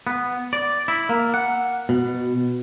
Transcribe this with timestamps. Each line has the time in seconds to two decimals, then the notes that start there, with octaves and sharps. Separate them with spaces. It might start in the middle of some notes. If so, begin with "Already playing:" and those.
0.07 B3
0.53 D5
0.88 E4
1.09 A#3
1.34 F#5
1.89 B2